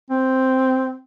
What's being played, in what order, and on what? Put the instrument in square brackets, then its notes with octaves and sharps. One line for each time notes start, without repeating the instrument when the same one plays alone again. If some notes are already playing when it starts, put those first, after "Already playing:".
[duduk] C4